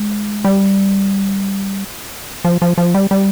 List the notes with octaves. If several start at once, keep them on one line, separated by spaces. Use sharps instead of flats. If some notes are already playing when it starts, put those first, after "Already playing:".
Already playing: G#3
G3
F3
F3
F3
G3
G3